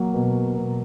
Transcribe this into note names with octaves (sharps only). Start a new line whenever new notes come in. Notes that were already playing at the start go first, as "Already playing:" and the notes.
Already playing: F#3 A#3
B2
B2